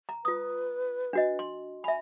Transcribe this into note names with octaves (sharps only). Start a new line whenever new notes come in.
A#5
F4 B4 D#6
D4 F#4 D#5
C6
E5 G#5 B5